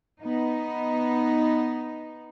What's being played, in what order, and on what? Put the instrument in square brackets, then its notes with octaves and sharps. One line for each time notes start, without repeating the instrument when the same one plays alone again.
[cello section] B3 D#4